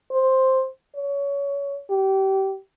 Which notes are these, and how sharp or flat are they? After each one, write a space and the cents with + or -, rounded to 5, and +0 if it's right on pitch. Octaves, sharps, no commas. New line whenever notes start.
C5 +5
C#5 +20
G4 -25